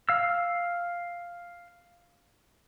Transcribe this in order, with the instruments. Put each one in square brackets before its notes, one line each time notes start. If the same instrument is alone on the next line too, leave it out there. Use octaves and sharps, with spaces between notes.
[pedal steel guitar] F5 E6